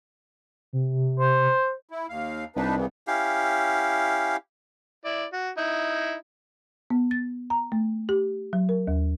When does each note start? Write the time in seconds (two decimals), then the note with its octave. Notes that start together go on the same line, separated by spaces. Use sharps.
0.73 C3
1.19 C5
1.90 E4
2.09 D#2 F5
2.56 C2 D4 D#4 B4
2.76 C#3 E3 B3
3.07 C#4 E4 G4 F5
5.05 E4 D5
5.33 F#4
5.58 D#4 E4
6.90 B3
7.11 A6
7.50 A#5
7.72 A3
8.09 G4
8.53 F#3
8.69 A#4
8.87 D#2